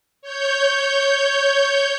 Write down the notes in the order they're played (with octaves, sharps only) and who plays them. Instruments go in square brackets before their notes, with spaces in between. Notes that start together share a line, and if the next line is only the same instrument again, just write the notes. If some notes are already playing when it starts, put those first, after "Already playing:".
[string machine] C#5 G6